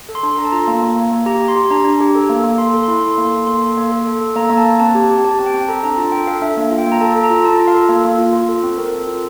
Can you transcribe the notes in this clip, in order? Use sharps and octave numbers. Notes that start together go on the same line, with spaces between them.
A4
C6
D4
A4 A#5
A5
F4 A#5
A#3
A#3
A#3
A#3
G4 A#5
G4
C6
G4
D4 A#5
D4
G4
A4
A#3
A#3
A4 C6
A4
E4 C6
A4 C6
A#3
A4
A#3 C6
A4
A#3
A4
A4
A4
A#3 A#5
A#3 A#5
A5
A#3
C4 A5
G4
G4
G4 A5
C4 A5
G5
C4
A4 A#5
D4 A#5
F4 A5
A4 G5
A4 F5
D4 E5
A#3
F4
G5
A#3
A#5
A4 A5
A4
A#5
F4
F4 A5
F4
F5
A4
A#3
A#3
F4
F4
A4
C4
C4 A#4
A4
F4